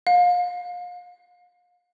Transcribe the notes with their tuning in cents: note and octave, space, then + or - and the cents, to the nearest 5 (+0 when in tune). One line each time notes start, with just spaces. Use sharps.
F5 +35